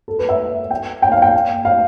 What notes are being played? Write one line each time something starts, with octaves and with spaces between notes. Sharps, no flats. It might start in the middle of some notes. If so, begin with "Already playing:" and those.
A4
B4
E5
G5
G5
F5
G5
F5